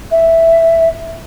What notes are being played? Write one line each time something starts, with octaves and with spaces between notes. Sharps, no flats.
E5